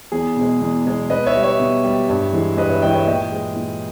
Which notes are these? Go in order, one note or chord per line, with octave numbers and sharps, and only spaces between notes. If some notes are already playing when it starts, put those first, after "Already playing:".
E2 G#4
B2 G#3
E2
B2 G#3
B2 B4 D#5
C#5 E5
G3
C#5 E5
B2
G3
G2
E3 G#3
G2 B4 D#5
C#5 E5
E3 G#3 D#5 G5
C#5 E5
A#2 D#5 G5
G#3
A#2